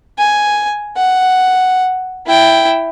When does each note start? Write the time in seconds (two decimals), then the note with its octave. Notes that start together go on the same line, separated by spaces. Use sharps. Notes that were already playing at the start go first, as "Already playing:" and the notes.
0.19 G#5
0.97 F#5
2.27 E4 G5